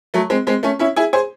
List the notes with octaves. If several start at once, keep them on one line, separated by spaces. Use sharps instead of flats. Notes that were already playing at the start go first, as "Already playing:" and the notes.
F#3 A3
G#3 C4
G#3 C4
A3 C#4
C#4 E4
E4 G#4
G#4 C5